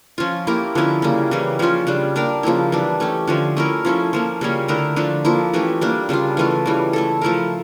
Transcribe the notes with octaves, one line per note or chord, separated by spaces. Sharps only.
F3 C#4 F4
A#3 E4 G4 A#4
D3 F3 C#4 E4
C#3 G3 A#3
C#3 E3 G3 C#4
C#3 F3 C#4 F4
C#3 G3 D4
A#3 D4 G4 A#4
C#3 F3 A#3 E4
E3 G3 D4
A3 C#4 G4
D3 F3 C#4
A3 C#4 E4 A#4
F3 C#4 E4 A4
F3 A#3 C#4
C#3 G3 A#3 C#4
D3 A3 E4 A#4
D3 F3 A3 D4
F3 A#3 E4
E3 A3 C#4 G4
G3 A#3 D4
C#3 G3 D4 F4
E3 A3 C#4 F4
C#3 E3 G3
A3 E4 A4
F3 A3 E4 A#4